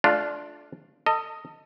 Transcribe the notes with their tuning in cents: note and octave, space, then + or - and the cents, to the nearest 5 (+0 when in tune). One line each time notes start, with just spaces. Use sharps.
A3 -30 D4 +0 F4 +0
A4 +35 D#5 +0